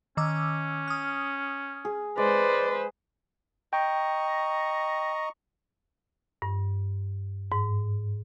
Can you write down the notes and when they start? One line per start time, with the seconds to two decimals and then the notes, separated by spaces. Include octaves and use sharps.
0.17 D#3 C#4 D6 E6
0.88 D#6 F6
1.85 G#4
2.17 G#3 B4 C5 D5
3.73 D#5 G5 A#5 C#6
6.42 G2
7.52 G#2